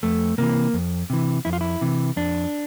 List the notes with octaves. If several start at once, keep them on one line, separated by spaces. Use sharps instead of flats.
F2 A3
C3 E3 A#3
F2
C3 E3
F2 E4
F4
E4
C3 E3
F2 D4